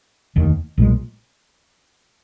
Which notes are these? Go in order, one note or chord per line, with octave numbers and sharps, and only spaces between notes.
F1 D#2 D#3
B1 A#2 G#3